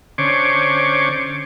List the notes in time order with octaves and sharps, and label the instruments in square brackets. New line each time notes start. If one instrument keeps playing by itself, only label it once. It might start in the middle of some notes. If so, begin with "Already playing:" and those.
[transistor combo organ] D3 C#4 C5 C#5 D6